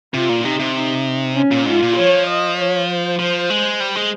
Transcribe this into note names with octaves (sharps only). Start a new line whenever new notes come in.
C3 F4
A#2
C3 D#4
C3
D#4
C#4
A#2
G#2 F4
A#2
F3 C#5
D#5
C#5
C5
F3
G#3
G3
G#3